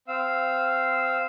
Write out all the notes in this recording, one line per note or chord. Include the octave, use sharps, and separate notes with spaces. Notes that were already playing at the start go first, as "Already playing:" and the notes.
C4 F5 E6